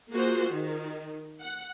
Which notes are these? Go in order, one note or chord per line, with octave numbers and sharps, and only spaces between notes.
A#3 F4 F#4 G#4 C5
D#3
F#5